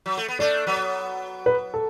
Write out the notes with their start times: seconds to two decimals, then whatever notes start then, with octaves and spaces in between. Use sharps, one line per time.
0.06 F#3
0.17 A3
0.28 B3
0.39 A3 D4 D5
0.67 F#3 B3
1.46 B4
1.74 A4